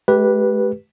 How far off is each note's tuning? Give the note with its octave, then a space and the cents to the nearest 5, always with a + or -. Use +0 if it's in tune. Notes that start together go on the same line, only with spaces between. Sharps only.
G#3 +45 G4 -10 B4 -10